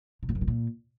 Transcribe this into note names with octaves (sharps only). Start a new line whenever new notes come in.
C3
G#2
F#2
B2
A#2